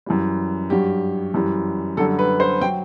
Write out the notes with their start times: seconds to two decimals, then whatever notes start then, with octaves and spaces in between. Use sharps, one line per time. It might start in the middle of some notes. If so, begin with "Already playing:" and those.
0.06 F#2 E3 G3
0.70 G2 F#3 G4
1.34 F#2 E3 G3
1.97 F#2 D3 G3 A4
2.19 B4
2.40 C5
2.61 F#3 G5